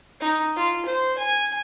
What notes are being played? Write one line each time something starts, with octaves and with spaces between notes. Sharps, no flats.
D#4
F4
C5
G#5